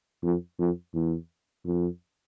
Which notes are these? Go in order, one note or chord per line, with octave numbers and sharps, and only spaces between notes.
F2
F2
E2
F2